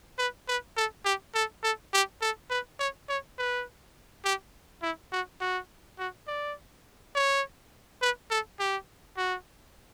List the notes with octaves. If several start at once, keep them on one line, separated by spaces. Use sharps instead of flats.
B4
B4
A4
G4
A4
A4
G4
A4
B4
C#5
C#5
B4
G4
E4
F#4
F#4
F#4
D5
C#5
B4
A4
G4
F#4